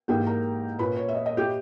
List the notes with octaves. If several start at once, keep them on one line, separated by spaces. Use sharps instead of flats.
G#2 E3 A#3 G4 G5
A#4 A#5
A#2 A#3 C#4 B4 B5
C#5
E5
D#5
D#5
G4 G5